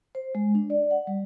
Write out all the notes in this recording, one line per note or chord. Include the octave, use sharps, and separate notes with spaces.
C5
G#3
D4
D5
F#5
G3